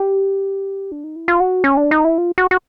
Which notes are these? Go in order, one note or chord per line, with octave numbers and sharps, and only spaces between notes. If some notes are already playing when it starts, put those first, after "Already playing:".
Already playing: G4
D4
D#4
E4
F4
F#4
C#4
D4
D#4
E4
F4
F#4
F#4